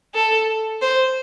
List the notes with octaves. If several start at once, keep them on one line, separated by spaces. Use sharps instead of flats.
A4
C5